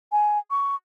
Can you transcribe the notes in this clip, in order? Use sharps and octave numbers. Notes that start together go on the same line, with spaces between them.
G#5
C#6